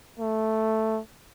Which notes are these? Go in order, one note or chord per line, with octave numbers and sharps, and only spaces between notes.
A3